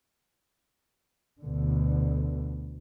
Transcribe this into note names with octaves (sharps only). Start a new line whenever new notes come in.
D2 B2 D3